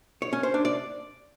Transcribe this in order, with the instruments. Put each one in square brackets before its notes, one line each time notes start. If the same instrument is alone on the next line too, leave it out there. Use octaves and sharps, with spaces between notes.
[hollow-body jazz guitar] C#5
C#4
C5
D4
D5